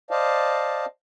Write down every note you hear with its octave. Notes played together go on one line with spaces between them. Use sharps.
C5 D5 D#5 F5 A5